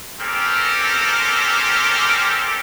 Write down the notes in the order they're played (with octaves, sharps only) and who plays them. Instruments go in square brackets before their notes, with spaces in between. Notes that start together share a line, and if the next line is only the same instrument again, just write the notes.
[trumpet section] C4 C#4 G4 A4 A#4